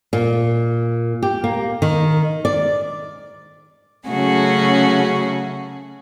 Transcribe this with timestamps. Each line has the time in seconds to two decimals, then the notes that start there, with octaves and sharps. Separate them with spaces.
0.13 A#2
1.23 G4
1.44 A#3
1.82 D#3
2.45 D5
4.08 C#3 F#3 A3 C#4 F#4 G#4